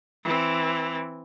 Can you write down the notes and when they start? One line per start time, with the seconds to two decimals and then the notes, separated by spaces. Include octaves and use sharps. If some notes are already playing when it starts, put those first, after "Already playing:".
0.24 E3 C4